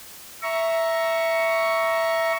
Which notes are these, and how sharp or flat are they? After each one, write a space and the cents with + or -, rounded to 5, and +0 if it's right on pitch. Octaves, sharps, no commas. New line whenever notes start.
E5 +0 A#5 +5 C#6 +5